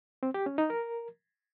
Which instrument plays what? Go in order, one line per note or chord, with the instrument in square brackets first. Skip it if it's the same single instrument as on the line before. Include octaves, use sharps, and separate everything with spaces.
[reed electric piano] C4
G4
C#4
D#4
A#4